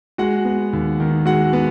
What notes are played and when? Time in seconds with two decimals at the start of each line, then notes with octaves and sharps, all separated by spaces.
0.18 G#3 F#4 F#5
0.45 B3
0.73 D#2
1.00 D#3
1.26 G#3 F#4 F#5
1.53 B3